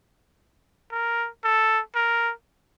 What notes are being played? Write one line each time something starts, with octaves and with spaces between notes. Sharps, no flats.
A#4
A4
A#4